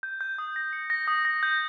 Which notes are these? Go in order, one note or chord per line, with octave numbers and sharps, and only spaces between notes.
G6
G6
D#6
A#6
C#7
A#6
D#6
A#6
G6